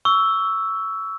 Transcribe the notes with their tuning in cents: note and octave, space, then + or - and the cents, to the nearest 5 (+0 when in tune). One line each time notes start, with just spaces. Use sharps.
C#6 +25 E6 +0